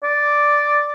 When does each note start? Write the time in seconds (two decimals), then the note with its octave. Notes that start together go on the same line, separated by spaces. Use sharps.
0.04 D5